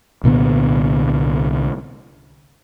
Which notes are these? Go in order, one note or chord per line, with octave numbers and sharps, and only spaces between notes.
C2 A#2 D3 B3